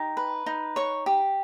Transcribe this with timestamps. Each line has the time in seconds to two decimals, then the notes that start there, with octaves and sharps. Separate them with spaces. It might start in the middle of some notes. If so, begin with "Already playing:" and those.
Already playing: D#4 G4
0.17 B4
0.46 D#4
0.76 C#5 C#6
1.06 G4